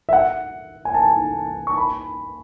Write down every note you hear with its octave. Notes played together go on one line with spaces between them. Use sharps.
E5
F#5
G#5
A5
C#6
B5